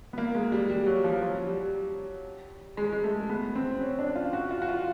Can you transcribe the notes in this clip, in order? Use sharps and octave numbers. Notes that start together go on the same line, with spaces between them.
B3
A#3
G#3
G3
G3
F#3
F3
F#3
G3
G#3
G#3
A3
B3
C4
C#4
D4
F4
F#4
F4
F#4
F4